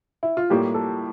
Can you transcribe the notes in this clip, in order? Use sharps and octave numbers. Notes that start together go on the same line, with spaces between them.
E4
F4
A2 G3 A#3 G4
A4